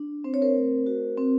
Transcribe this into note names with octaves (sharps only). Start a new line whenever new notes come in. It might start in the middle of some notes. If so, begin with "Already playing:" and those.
Already playing: D4
C4 C5
C#5
A#4 C5
A3
F#4
C4